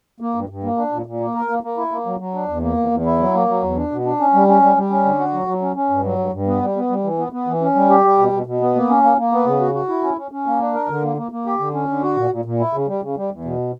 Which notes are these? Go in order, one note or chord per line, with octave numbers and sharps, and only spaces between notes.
A#3
G2
G2
A#3
D4
A#2
A#2
A#3
A#4
A#3
A#3
E4
A#3
F#3
F#3
D4
E2
A#3
E2
E2
E4
F#3
A#3
F#3
E2
D4
B2
D4
C#4
G3
C#4
G3
G3
C#4
D3
F#4
F#3
F#3
C#4
C#4
G2
F#3
G2
G2
B3
G3
B3
G3
E3
B3
B3
E3
C#4
G3
G4
G3
B2
B2
B2
B3
A#3
C#4
A#3
A#3
B3
C#3
F#4
F#4
E4
C#4
C#4
C#4
A#3
D4
A#4
D3
A#3
A#3
A#3
G4
D3
C#4
D3
F#4
A#2
A#2
A#2
E4
C#3
G3
C#3
G3
E2
B2